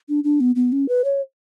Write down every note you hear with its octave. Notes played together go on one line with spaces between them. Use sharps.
D4
D4
B3
B3
C#4
B4
C#5